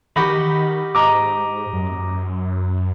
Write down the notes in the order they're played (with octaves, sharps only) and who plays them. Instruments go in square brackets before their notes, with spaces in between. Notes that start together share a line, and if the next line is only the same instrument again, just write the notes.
[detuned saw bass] D#3 [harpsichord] D#4 F#4 G4 [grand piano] B5
[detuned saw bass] G#2 [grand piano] D#5 A#5 D6
[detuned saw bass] F#2